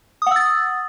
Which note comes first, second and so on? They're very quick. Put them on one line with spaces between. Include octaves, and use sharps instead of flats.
D#6 F#5 E6 A6